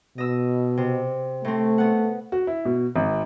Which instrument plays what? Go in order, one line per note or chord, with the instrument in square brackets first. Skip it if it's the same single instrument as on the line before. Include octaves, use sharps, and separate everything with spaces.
[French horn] B2 [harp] D#5 E6
[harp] C3
[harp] A2 C4 [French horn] A3
[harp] B3 F#5
[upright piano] F#4
E4
B2
G#1